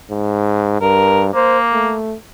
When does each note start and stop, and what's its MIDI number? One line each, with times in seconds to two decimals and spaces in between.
0.11 0.80 44
0.81 1.31 43
0.81 1.23 70
1.34 1.95 58
1.34 1.58 72
1.73 2.15 57